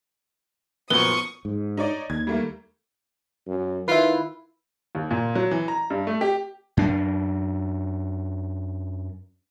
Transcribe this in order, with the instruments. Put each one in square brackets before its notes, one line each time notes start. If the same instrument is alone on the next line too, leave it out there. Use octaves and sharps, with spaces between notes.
[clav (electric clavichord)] F#2 A#2 F3 [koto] B3 [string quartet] C#6 D#6 [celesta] G7
[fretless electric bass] G#2
[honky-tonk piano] D#4 C#5 D5
[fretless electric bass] D#2 [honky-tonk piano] G#6
[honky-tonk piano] G3 A3 A#3
[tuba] F#2
[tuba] D#3 [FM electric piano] E4 B4 [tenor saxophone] F4
[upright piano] D#2
A#2
F#3
E3
A#5
G2
A3
G4
[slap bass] F#2 D4